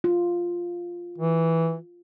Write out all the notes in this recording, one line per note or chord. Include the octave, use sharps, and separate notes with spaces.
F4
E3